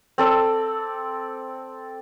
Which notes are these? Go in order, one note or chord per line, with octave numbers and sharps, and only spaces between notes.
C4 A4 D5